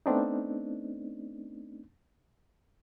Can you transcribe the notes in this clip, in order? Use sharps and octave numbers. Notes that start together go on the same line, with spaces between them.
A3 B3 C4 D4 D#4